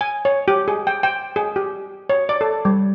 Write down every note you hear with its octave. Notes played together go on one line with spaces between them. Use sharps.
G#5
C#5
G4
G#4
G5
G5
G#4
G4
C#5
D5
A4
G3